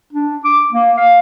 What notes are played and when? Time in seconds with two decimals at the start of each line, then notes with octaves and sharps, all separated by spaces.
0.13 D4
0.45 D6
0.72 A#3
0.97 F5